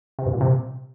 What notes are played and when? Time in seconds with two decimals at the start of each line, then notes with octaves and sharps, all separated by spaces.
0.19 C3
0.26 G2
0.33 A#2
0.41 C3